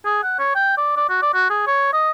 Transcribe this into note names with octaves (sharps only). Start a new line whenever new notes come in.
G#4
F#5
C#5
G5
D5
D5
F#4
D5
F#4
G#4
C#5
D#5